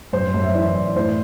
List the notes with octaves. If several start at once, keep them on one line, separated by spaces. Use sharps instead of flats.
F#2 C5
F#2
E5
E3 D5
F#2
A2 C5